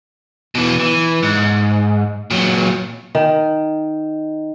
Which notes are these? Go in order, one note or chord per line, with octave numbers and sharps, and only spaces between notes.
B2 E3
E3
G#2
A#2 F#3
D#3